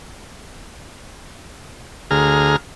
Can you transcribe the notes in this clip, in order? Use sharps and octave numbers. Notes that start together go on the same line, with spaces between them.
D2 G#4 A#5 F6